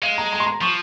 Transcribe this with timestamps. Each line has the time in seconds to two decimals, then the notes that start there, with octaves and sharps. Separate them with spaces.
0.02 G#3 F5
0.18 A#5
0.33 A#5
0.40 C6
0.47 A#5
0.61 F3 C#6